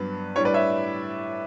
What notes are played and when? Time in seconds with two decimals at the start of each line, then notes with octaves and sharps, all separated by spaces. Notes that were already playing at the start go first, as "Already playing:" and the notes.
Already playing: G2 F#3 B3 D4 B4
0.36 A2 G3 D4 C#5
0.45 B4 D5
0.54 C#5 E5